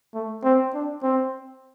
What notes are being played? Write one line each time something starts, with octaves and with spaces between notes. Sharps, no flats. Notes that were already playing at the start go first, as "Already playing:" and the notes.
A3
C4
D4
C4